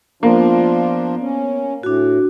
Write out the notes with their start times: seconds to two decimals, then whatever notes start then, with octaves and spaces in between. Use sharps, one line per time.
0.23 F3 A#3 B3 D4 F4
1.21 C#4
1.83 A2 D4 F#4